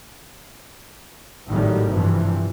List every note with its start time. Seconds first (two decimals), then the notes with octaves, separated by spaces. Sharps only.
1.49 G#1 A2 D#3 F#3 G3
1.90 G2 C3 E3 F3